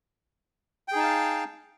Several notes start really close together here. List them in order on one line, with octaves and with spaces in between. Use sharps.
G5 G#4 D#4 A5 F5